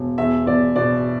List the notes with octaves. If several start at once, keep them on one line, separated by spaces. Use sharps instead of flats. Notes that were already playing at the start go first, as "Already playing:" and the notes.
Already playing: E1
E2 E5
E2 D5
B2 D5